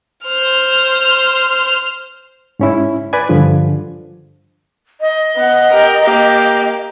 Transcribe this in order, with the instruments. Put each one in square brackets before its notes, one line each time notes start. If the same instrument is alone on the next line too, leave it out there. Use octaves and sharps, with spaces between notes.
[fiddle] C5 F6
[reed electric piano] G#2 C#4 E4
B4 D5 G#5
G2 D3 F3
[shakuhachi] D#5
[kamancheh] B3 F#5
G4 A#4
A#3 G4